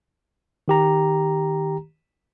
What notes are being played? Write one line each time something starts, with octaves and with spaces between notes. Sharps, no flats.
D#3 G4 A#5